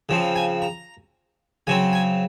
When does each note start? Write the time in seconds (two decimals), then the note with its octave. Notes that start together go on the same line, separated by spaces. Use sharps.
0.09 C#3 F3 C4
0.36 G#5
0.62 A#5
1.67 C#3 F#3 C4 G#5
1.93 G#5